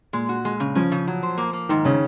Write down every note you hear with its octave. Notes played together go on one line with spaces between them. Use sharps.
A#2 G#3
F#4
G#3
C#3
F3 C#4
C#3
F#3
C5
A#3
A#3
G#2 D#3
C#3 C#4